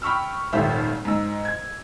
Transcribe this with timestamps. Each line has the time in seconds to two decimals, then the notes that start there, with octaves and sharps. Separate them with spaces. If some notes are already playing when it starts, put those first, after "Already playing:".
0.02 G5 B5 C#6 E6 F6
0.53 D#1 G#1 G4 A4 C5 E5
1.05 G#2 E6
1.45 G#6